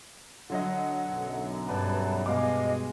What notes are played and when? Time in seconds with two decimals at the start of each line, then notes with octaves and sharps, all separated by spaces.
0.50 D3 F#3 D#5 F#5
1.06 B1 F#2
1.69 G2 B4 D5 A5 F#6
2.26 B2 G#3 D#5 F5 D6